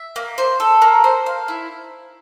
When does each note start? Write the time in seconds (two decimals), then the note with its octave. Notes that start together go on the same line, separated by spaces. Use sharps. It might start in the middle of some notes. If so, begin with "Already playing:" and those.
Already playing: E5
0.16 A#3
0.38 C5
0.60 A4
0.82 A#3
1.04 C5
1.26 F5
1.48 E4